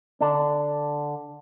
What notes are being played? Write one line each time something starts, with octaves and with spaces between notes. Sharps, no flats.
D3 D4